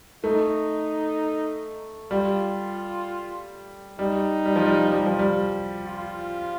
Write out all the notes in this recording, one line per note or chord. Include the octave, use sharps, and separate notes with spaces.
A3 D#4
G3 F4
G3 D#4
G3
F3
G3
G3
F3
G3
F4